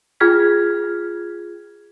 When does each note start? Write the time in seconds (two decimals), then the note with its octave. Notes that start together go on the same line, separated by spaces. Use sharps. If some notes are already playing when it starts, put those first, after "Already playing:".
0.20 F4 G#4 G5 F6 G#6 B6